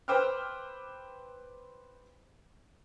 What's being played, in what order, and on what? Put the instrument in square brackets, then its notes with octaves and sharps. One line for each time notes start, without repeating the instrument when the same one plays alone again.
[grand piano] B4 C5 G5 D6 E6 F6